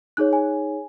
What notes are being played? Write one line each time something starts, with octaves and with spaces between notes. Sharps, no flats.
D#4 G#4 C#5 F#6
G#5